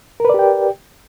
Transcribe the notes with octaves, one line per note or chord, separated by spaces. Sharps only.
G4 A#4 B4 D5 G5